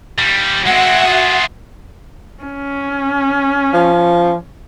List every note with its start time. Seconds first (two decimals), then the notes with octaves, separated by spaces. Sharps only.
0.18 D#2 G3
0.66 G#3 C4 F#4 E5 F#5
1.05 F4 G#4
2.43 C#4
3.73 F3